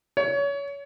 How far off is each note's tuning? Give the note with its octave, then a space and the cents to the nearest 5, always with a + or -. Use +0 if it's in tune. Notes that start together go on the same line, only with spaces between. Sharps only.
C#5 +30